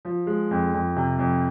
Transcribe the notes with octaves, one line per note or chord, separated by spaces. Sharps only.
F3
G#3
F2
F2
C3
F2